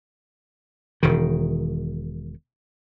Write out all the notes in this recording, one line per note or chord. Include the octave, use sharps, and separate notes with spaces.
E1 D#3